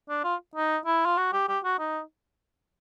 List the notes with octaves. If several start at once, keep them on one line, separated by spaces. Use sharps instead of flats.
D4
F4
D#4
E4
F4
F#4
G4
G4
F#4
D#4